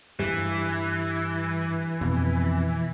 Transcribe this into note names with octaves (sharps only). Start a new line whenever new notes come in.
G2 E3 G3
F2 B2